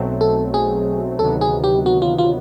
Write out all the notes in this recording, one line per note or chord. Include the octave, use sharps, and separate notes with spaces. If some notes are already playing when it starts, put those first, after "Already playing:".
Already playing: B1 B2 F#3 A3 C4
A4
G#4
D2 C3 D#3 F#3 B3 A4
G#4
G4
F#4
F4
F4